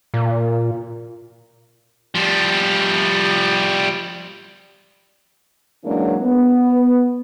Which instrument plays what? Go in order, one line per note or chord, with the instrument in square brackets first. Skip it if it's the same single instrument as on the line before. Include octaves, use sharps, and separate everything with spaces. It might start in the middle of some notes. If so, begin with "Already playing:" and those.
[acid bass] A#2
[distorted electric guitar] F3 G3
[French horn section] E3 F#3 G#3 A#3 C#4 D4
B3